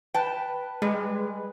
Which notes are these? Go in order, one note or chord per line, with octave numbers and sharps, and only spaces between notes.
B4 G5 A5
G3 G#3